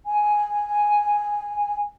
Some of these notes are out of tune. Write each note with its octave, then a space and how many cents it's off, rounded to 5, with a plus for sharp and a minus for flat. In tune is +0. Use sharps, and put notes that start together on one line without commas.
G#5 -5